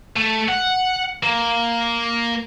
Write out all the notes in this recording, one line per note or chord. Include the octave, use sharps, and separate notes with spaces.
A3
F#5
A#3